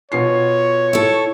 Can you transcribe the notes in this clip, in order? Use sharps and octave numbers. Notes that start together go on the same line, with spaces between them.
B2 F4 C#5 C7
E4 A4